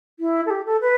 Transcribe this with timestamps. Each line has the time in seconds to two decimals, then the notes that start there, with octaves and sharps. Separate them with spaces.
0.19 E4
0.45 A4
0.50 G4
0.65 A4
0.80 B4